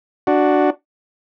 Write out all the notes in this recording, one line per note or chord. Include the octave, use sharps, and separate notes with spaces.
D4 F#4